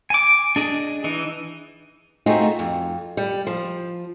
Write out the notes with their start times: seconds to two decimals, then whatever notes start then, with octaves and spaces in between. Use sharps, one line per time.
0.10 G#5 D6
0.56 D4 G#4 D#5
1.04 E3 D#4
2.26 A3 C4 D#4 F4 F#4 G#4
2.59 F2
3.17 G3
3.47 F3